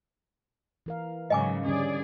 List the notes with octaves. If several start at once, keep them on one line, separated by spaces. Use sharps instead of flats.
E3 A#4 F5
G#2 C#3 F#3 D#5 G#5 D6
D3 G3 C#4 G#4 D5